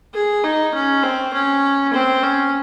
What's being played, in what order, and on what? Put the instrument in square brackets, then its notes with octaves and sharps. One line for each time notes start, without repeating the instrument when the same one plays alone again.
[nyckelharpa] G#4
D#4
C#4
C4
C#4
C4
C#4